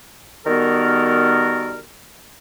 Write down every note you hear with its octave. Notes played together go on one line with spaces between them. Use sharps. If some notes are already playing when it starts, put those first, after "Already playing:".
D#3 G3 B3 F#4 A4 A#4